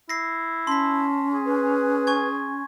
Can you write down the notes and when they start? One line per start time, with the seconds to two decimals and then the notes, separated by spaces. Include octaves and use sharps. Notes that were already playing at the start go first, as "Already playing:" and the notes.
0.09 E4 A#6 C7
0.67 C#4 A5 C6 B6
1.34 G#4
1.46 B4
2.07 G#5 C#6 G#6